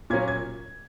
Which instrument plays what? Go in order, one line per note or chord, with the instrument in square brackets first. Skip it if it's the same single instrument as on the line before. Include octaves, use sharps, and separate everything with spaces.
[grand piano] A#2 F#3 A#3 C#4 G#6
G#6